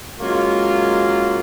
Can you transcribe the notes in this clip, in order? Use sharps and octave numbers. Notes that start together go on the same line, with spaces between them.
F#3 G#3 A#3 C#4 F4